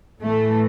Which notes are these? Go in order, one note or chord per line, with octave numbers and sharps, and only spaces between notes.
A2 E3 A3